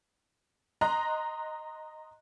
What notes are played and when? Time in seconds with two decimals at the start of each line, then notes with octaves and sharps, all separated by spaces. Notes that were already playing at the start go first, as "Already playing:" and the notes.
0.81 D#5 A#5 C6 F#6 A#6